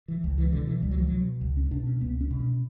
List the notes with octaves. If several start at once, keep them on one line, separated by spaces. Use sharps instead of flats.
E3
C#2
E3
B2 D3
E3
C#2 G3
F#3
E3
B2 F#3
C#2
C#4
B2 D4
C#4
C#2 B3
C#4
B2
C#4